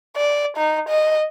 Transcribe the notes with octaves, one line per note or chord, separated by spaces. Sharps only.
D5
D#4
D#5